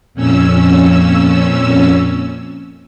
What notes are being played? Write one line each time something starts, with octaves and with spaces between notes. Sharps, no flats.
F2 A#2 C#4 E6